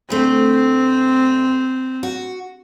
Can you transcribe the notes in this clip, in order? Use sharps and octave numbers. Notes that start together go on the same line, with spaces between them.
D2 A3 C4
F#4